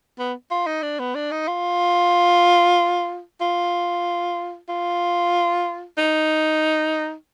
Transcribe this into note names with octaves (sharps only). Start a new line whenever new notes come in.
B3
F4
D#4
D4
B3
D4
D#4
F4
F4
F4
D#4